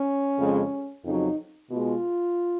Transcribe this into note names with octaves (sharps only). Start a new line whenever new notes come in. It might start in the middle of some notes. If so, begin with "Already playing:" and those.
Already playing: C#4
F2 C#3 G#3
F2 C#3 F#3 D#4
B2 G#3 F4